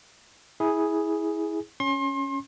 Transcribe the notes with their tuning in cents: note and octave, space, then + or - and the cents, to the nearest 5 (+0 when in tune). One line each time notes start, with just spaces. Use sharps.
E4 -20 G#4 +0
C#4 +0 C6 +35